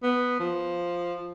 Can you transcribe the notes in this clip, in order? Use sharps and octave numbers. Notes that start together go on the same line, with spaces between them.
B3
F3